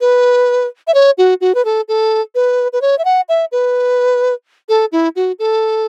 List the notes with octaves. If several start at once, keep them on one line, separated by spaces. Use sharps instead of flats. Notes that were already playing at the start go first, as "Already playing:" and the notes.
B4
E5
C#5
F#4
F#4
B4
A4
A4
B4
B4
C#5
E5
F#5
E5
B4
A4
E4
F#4
A4